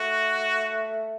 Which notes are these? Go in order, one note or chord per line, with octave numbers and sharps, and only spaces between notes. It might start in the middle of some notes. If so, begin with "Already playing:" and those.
Already playing: A3 F#4